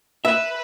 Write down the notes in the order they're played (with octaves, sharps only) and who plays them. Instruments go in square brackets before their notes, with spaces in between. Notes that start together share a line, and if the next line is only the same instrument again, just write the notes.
[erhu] B4 [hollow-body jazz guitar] E5